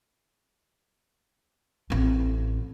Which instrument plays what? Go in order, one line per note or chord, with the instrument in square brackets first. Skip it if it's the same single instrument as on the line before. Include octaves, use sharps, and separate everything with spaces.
[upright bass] A1 C4